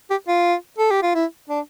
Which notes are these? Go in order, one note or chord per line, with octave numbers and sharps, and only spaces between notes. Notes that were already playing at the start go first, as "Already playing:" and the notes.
G4
F4
A4
G4
F4
E4
D4